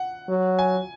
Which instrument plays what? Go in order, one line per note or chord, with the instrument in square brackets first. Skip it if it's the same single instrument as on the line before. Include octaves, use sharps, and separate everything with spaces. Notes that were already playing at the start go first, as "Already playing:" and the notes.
Already playing: [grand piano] F#5
[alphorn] F#3
[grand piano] G#5